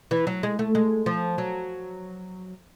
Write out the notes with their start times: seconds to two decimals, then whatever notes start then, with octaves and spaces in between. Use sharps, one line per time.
0.11 E3
0.27 F#3
0.43 G#3
0.59 A3
0.75 G#3
1.06 F3
1.38 F#3